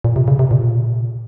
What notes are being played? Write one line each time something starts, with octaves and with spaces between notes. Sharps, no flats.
A#2
C3
C#3
C3
A#2